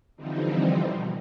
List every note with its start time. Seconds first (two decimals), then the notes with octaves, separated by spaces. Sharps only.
0.17 D3 E3 F3 G3 C4 D#4
0.81 B2